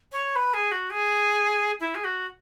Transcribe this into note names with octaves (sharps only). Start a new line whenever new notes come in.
C#5
B4
G#4
F#4
G#4
E4
G#4
F#4